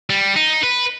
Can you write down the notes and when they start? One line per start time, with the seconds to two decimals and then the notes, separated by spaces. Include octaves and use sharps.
0.10 G3
0.36 D#4
0.63 B4